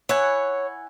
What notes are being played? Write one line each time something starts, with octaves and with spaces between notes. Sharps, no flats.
E4 C#5 F#5 G#5